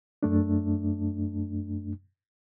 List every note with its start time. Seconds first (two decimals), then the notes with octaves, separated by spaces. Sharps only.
0.23 F#2 A3 D4